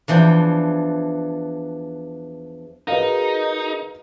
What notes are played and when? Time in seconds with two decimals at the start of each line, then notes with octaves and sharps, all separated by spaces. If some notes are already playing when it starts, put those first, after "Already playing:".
0.08 E2 E3 F3 D4 G5
2.88 D#4 F#4 G#4 A#4 B4 D#5 F5